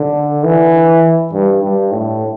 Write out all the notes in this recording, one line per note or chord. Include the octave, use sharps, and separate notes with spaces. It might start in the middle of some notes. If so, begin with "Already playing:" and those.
Already playing: D3
E3
G2
G2
A2